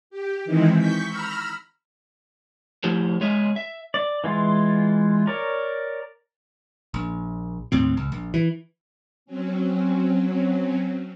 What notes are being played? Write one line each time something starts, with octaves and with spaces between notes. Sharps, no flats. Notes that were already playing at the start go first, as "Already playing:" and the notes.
G4
D#3 E3 G#3 C4 D#4 E4
C#6 G6 B6
A#5 B5 E6 F6
F3 A3 E4 G4 C5
G#3 C#5 D#5 E5
E5
D5
E3 G#3 F4
A#4 C#5 D5
A#1
D#2 A2 C4
C#2
A#1
E3
F#3 C4 C#4